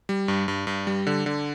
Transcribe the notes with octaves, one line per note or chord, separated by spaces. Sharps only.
G3
G2
G2
G2
G3
D3
D3